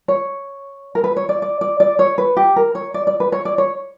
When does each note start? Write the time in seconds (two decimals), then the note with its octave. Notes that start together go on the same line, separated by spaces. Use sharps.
0.08 C#5
0.95 A#4
1.04 B4
1.17 C#5
1.29 D5
1.42 D5
1.61 D5
1.80 D5
1.99 C#5
2.18 B4
2.37 G4
2.56 A#4
2.75 C#5
2.94 D5
3.07 D5
3.20 B4
3.32 C#5
3.45 D5
3.58 C#5